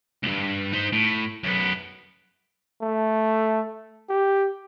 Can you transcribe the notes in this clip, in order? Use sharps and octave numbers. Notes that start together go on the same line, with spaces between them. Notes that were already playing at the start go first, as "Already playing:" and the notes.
C#2 G2
D#4 C5
A2
F#2 B3
A3
G4